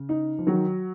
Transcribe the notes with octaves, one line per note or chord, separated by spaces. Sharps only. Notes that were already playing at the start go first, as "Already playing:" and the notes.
Already playing: C#3
D#4
F3
D#3 F#3